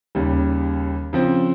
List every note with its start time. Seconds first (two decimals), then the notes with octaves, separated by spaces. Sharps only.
0.15 D#2 C#3 G3
1.13 C#3 F3 C4